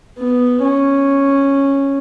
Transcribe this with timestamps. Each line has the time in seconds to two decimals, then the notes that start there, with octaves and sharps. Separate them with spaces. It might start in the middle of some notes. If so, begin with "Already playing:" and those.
0.18 B3
0.62 C#4